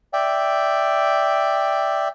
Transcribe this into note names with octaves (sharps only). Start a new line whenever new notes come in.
D5 E5 G5